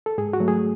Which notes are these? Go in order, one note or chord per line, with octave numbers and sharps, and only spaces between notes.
A4
G#2 G#4
F#4
F#3 A3
G#4